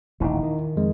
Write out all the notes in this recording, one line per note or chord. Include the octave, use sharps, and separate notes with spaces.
D#1 A1 D#2 D#4 E4
D#3
F2 G#3